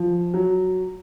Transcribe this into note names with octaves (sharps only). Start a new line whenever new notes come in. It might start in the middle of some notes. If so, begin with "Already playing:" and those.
Already playing: F3
F#3